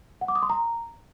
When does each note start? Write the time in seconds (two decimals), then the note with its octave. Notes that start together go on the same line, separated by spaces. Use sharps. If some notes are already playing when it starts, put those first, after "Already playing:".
0.21 F#5
0.28 D6
0.35 D#6
0.43 C6
0.50 A#5